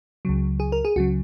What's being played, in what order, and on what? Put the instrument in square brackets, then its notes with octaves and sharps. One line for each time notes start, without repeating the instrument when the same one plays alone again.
[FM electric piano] C#2 C#3 F#3
G#4
A#4
G#4
C#2 C#3 F#3 F#4